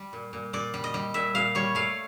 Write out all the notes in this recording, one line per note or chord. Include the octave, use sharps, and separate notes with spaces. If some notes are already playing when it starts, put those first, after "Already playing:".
Already playing: G3
A#2
A#2
A#2 D5
G3
D#5
G3
A#2 E5
A#2 F5
G3 C#5
A3 F5